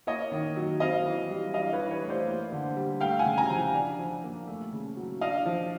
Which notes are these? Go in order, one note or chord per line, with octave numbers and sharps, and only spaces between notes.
A#3 C#5 D#5
D#3
F#3
C4 D#5 F5
E3
G3
D4 D#5 F5
B4 C#5
E3
B4 C#5
A3
C5 D5
A#3
D3
G3
A3 F5 G5
F#5 G#5
C#3
G#5 A#5
F3
D4
F3
A#3
A3
C#3
F#3
D4 D#5 F5
F3